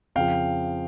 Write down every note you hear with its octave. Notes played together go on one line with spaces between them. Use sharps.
F2 C#3 F3 F5 G5